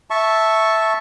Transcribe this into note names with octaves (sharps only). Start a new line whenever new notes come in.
E5 A5 C#6